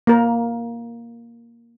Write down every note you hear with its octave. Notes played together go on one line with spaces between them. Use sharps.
A#3 A#4